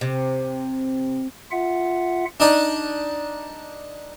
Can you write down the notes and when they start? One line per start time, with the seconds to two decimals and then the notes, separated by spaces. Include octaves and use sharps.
0.01 C3
1.51 F4 E5 F#5
2.40 D4 D#4 D5